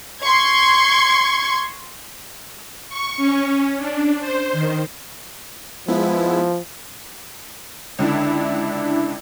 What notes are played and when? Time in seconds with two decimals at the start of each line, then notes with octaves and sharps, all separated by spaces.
0.20 C6 C#6 G#6
2.89 C#6
3.17 C#4
3.77 D4
4.20 C5
4.53 D#3
5.88 F3 G#3 B3 E4
7.99 C#2 D3 D4 E4